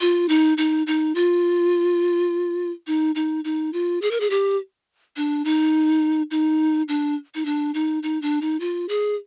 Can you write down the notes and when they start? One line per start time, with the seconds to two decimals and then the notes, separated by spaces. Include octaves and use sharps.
0.01 F4
0.29 D#4
0.58 D#4
0.87 D#4
1.15 F4
2.87 D#4
3.15 D#4
3.44 D#4
3.73 F4
4.02 G#4
4.11 A#4
4.20 G#4
4.30 G4
5.16 D4
5.45 D#4
6.31 D#4
6.88 D4
7.35 D#4
7.45 D4
7.74 D#4
8.03 D#4
8.22 D4
8.41 D#4
8.60 F4
8.89 G#4